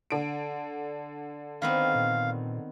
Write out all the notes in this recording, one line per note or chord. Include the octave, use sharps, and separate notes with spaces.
D3 D7
D#3 B3 C4 F5
A#2